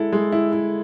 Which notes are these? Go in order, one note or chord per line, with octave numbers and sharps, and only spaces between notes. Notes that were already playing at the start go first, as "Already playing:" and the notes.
Already playing: G#3 E4 A4
G#3
E4
E4